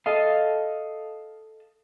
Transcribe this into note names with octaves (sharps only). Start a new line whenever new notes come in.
A4 D#5 F5